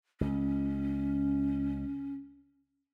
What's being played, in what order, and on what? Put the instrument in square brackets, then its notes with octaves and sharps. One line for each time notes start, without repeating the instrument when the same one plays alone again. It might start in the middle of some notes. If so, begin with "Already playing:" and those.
[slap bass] C#2 [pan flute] C#4